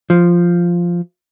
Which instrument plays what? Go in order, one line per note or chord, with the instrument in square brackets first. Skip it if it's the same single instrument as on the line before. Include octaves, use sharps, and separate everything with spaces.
[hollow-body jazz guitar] F3